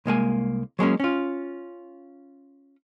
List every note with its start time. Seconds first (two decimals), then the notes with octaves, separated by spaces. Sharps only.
0.06 C2 G#3 A#3 G#5
0.79 F#3 G#3 A#3 C#4
1.00 C#4 F4